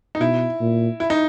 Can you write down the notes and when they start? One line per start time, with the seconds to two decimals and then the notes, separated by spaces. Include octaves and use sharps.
0.15 D#4
0.20 B2 E4
0.61 A#2
1.00 E4
1.10 D#4